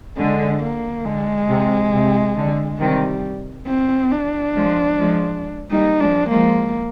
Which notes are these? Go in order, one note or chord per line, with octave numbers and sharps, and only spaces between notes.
D3 G#3
A#3
D3 G#3
C3
C3
D3
C3 D#3 G3
C4
D4
F3 G#3
F3 G#3
G3 A#3 D#4
F3 G#3 D4
F3 G#3 A#3